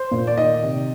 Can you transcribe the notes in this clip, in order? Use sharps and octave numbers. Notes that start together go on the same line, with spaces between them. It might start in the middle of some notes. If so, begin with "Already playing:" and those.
Already playing: C5
A#2
D5
D#3 D#5
C3